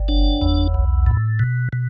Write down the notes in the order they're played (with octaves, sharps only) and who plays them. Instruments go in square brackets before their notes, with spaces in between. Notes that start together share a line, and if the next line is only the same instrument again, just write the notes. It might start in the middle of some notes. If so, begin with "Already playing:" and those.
Already playing: [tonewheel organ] G1
F#1 D4
E2
B1
A2
B2
B2